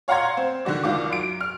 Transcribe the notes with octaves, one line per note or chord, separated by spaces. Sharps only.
C#5 F5 F#5 A#5 C6 G#6
C4
D3 D#3 F#4 D5
C2 D#3 F4 F#4 D6
F#2 D7
F6